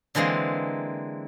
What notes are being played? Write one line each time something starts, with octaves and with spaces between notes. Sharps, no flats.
D3 E3 G#3 A#3 C4